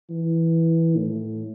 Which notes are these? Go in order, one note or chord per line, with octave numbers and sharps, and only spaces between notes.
E3
A2